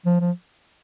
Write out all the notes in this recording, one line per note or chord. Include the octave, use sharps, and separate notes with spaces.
F3
F3